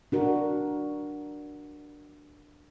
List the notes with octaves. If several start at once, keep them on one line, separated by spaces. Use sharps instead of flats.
D4 F#4 A#4